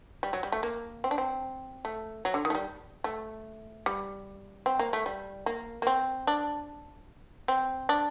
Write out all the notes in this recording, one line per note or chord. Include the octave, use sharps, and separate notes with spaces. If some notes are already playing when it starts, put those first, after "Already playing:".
G3
F#3
G3
A3
A#3
C4
D4
C4
A3
F#3
D3
D#3
A3
G3
A3
G3
C4
A#3
A3
G3
A#3
A#3
C4
D4
C4
D4